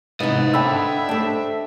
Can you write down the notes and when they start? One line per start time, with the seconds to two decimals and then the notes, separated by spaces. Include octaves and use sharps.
0.20 G#2 C3 E3 B3 D#4 C5 D#5
0.54 D3 D4 E5 G5 B5 E6
1.09 A3 D4